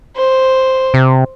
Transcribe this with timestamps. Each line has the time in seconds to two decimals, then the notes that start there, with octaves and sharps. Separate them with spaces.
0.17 C5
0.94 C3